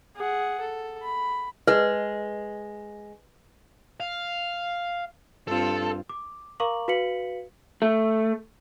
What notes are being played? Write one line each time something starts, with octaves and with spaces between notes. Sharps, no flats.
G#4 F#5
A4
B5
G#3 B4
F5
G2 C4 F4 A4
D6
A#4 F5 A#5 C#6 D6 F#7
F#4 B4 F5 B6 C#7 F#7
A3